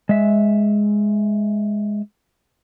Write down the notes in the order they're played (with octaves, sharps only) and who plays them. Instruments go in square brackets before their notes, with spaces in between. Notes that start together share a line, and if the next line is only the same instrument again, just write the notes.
[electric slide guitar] G#3 E5